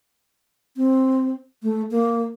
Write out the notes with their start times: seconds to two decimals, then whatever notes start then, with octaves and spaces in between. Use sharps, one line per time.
0.77 C4
1.63 A3
1.91 A#3